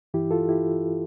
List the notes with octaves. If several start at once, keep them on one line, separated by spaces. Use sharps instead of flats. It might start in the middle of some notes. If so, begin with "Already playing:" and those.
G2 E3 E4 G4
F4 A4
E4 G4